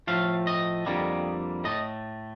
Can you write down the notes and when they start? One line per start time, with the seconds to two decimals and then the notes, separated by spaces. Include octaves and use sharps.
0.07 A2 F3 A3 F5
0.47 D#5
0.86 F2 D3 G3 A#3
1.64 A2 A3 D#5